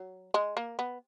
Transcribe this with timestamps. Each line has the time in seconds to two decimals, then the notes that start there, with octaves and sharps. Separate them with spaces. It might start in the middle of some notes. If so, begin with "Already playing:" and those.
Already playing: F#3
0.34 G#3
0.57 A#3
0.79 B3